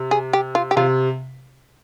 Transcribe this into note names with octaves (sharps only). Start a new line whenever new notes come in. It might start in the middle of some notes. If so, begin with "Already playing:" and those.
Already playing: C3
G#4
G4
F4
G4
C3 F4